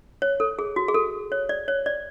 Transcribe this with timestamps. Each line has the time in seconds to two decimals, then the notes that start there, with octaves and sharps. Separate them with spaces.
0.22 C#5
0.40 A4
0.59 G#4
0.76 F#4
0.88 G#4
0.94 A4
1.32 C#5
1.49 D5
1.68 C#5
1.86 D5